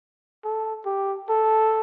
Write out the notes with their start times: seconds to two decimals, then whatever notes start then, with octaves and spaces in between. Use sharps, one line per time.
0.44 A4
0.86 G4
1.29 A4